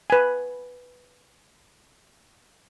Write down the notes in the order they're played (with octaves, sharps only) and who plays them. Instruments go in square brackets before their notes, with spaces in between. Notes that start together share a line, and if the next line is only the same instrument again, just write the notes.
[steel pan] B4 G#5